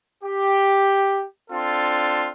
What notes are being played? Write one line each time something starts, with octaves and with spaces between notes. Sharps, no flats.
G4
C4 D4 F4 A4